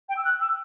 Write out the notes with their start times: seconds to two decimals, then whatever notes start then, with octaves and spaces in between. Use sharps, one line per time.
0.09 G5
0.17 E6
0.25 F#6
0.41 E6